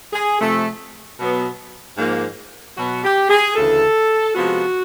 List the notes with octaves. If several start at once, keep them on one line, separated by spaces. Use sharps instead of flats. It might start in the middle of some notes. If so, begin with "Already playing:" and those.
G#4
C3 F3 A3
B2 F#3 B3
G#2 F3 A#3
B2 F#3 B3 F#4
G4
G#4
D2 C#3 E3 A4
C3 F3 G#3 B3 F#4